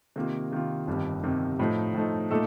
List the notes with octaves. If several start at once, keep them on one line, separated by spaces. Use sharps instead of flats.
C3 D#3 A#3 F4
C3 D#3 A#3 F4
G1 F2 C3 D#3 G3
G1 F2 C3 D#3 G3
A2 F3 A3 D#4
A2 F3 A3 D#4
A#2 A3 D#4 A4